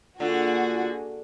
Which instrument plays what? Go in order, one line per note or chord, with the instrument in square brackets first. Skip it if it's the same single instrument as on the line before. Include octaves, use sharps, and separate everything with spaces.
[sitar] D3 [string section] A#3 F#4 G#4 [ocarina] F4